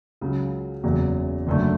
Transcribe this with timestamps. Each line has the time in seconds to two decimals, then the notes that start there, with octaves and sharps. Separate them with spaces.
0.21 C#2 C#3 F#3
0.84 F#1 E2 C#3 F#3
1.47 F#1 F#2 D3 A3